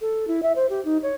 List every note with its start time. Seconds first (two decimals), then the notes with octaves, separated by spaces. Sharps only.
0.01 A4
0.28 E4
0.43 E5
0.56 C5
0.70 G4
0.85 D#4
1.03 C#5